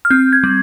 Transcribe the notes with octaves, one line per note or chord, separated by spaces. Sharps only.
F6
C4 G6
G#6
G3